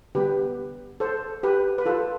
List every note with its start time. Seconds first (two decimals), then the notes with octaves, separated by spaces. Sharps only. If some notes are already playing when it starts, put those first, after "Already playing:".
0.15 D3 G3 B3 G4 B4
1.00 A4 C5
1.43 G4 B4
1.78 B4
1.86 F4 A4